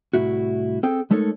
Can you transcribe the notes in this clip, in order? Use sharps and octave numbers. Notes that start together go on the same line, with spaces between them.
C2 A2 E4 F#4
C4 G#4 A4 G5
G#3 A3 D#4 A4 A#4 C#5